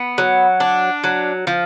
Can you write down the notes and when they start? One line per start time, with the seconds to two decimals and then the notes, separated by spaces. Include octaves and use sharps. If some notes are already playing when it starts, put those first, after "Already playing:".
Already playing: B3
0.18 F#3
0.60 D4
1.04 F#3
1.47 F3